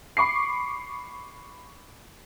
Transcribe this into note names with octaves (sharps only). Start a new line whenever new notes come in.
B5 C#6 D6 C7